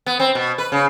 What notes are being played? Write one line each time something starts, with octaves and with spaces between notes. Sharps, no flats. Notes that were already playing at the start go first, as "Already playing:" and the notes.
B3
C4
B2
B4
C#3